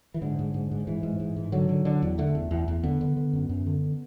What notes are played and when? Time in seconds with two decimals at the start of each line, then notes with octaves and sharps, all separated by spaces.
0.14 E3
0.21 G#2 D3
0.39 G#2
0.54 G#2
0.71 G#2
0.87 G#2 E3
1.03 G#2
1.20 G#2
1.36 G#2
1.52 D3 F#3
1.69 D3
1.85 D3
2.02 E2
2.18 D3 A3
2.35 E2
2.51 E2
2.68 E2
2.83 D3 B3
3.01 D3
3.16 D3
3.33 F#2
3.49 F#2
3.67 D3